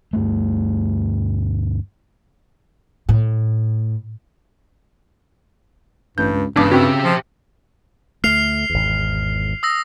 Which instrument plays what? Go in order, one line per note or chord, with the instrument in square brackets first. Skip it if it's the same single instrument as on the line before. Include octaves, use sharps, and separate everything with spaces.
[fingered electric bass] D2 G2 G#3 A3
[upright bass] A2
[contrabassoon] A1 [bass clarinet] G2 [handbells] G6
[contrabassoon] C#2
[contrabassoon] E1 [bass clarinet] G2 [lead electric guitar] C#3 [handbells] D4 D6
[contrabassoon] C#3 [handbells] C4 F#4 [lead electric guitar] G4 E5
[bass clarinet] F3
[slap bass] D2 A3 [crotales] F6 C7 F7
[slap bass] G#1 E2
[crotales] D#6 E6 A#6